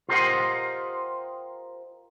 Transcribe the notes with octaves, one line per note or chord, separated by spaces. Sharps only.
F4 G4 A#4 C5 D#5 F#5